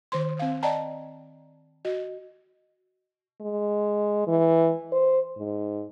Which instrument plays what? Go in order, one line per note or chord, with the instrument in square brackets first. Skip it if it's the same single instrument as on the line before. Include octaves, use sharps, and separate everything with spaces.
[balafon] D#3 C5 C6
C4 F5
D5 D#5 G5 A5 A#5
F#4 D#5
[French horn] G#3
E3
C5
G#2